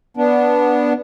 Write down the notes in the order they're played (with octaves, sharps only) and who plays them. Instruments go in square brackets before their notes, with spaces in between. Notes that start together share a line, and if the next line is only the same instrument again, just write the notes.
[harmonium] B3 D4